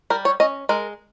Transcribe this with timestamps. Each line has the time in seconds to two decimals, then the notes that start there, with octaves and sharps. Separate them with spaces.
0.10 G3 A#4
0.25 C#5
0.40 C#4 D#5
0.69 G#3 A#4